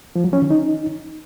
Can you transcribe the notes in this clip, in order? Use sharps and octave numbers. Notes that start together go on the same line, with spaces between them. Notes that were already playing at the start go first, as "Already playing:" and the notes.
F3
F#3
C#4
D#3
D#4